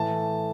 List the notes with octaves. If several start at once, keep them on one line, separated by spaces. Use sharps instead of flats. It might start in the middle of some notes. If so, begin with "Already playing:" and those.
Already playing: A2 E3 A3 A5